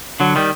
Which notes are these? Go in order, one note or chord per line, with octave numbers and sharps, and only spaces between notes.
D3 F#3
D#3 G3